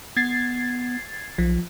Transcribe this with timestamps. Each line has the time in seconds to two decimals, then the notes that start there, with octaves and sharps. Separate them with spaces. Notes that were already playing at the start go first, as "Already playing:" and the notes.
0.17 B3 G#6 A6 C7
1.38 B1 F3